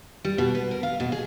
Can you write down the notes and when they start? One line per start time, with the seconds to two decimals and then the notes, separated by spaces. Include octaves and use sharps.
0.25 G3
0.38 B2
0.55 B4
0.71 A#4
0.83 F5
1.00 B2
1.12 G#4